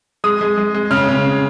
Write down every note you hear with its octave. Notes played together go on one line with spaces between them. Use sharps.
G#3 D#6
G#3
G#3
G#3
C#3 F6
C#3